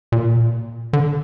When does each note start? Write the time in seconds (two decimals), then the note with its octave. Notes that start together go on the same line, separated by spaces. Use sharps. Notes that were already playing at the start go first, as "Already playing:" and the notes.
0.12 A#2
0.93 D3